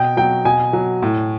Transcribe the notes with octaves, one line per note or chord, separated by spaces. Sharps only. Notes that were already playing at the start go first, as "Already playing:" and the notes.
Already playing: B2 G5
F#3 G5
B2 G#5
F#3
A2